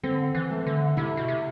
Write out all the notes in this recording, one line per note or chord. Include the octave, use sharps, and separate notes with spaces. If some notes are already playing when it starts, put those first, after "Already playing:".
D3 C4
E3
A3
D3
C3 E4
B2
C3